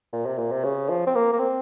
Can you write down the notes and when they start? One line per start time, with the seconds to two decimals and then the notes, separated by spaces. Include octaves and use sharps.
0.13 A#2
0.26 C3
0.38 A#2
0.52 C3
0.64 C#3
0.90 F3
1.07 C4
1.15 A#3
1.33 A#3
1.39 C4